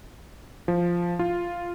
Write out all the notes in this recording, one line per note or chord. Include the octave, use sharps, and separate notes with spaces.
F3
F4